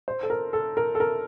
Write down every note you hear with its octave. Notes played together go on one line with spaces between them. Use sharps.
C5
A4
A#4
A4
A#4
A4
A#4